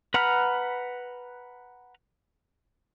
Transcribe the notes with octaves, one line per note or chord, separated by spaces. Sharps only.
B4 F#5 A#5 B5 F6